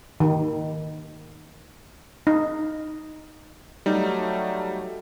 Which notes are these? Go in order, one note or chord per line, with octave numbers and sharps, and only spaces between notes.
D#3
D#4
F#3 G3 A3 D#4